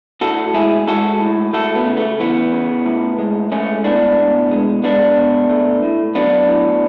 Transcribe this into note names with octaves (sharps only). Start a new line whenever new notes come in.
A2 F#4 A4
G#3 E4 G#4
G#3 F#4 A4
A2
A3 F#4 A4
B3
C#3
A3
E3 B3
C#3
A2
G#3
G#3 A3 C#4
A2 B3 D4
B2
G#3
G#3 B3 D4
B2
A3
A2
F#3 B3 D4
A2